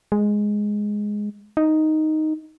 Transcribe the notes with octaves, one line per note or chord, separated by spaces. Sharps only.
G#3
D#4